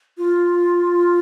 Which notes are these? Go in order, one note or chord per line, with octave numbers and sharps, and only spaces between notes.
F4